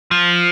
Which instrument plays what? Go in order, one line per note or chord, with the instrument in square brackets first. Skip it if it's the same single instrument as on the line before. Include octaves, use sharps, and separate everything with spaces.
[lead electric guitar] F3